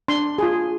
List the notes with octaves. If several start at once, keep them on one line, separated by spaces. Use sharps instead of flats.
D4 C6
F4 G#4